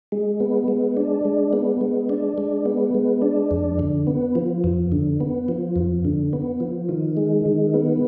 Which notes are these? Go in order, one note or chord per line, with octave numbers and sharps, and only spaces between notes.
G#3
B3
G#3
D4
G#3
B3
G#3
D4
G#3
B3
G#3
D4
F2
D3
B3
F3
F2
D3
B3
F3
F2
D3
B3
F3
D#3
G#3
D#3
B3